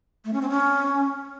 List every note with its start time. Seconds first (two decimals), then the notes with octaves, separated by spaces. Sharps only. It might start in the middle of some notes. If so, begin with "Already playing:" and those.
0.25 A3
0.33 C#4
0.42 C4
0.50 C#4